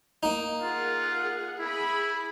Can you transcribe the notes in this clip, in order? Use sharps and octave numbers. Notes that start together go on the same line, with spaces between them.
A#3 D#4
F4 G#4 A#4 F#5
E4 G#4 B5